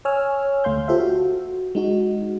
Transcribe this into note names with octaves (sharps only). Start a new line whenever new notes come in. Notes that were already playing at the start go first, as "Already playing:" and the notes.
C#5 G#5 E6 F6
D2 A3 F5 C6 G6
F4 G4 A4 C5 E5 F5
F#4
G#3 D#4 F#4